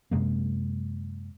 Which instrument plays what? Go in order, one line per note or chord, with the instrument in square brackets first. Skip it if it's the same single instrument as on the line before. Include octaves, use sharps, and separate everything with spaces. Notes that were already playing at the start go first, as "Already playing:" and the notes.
[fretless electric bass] F#2 C3 G#3 A#3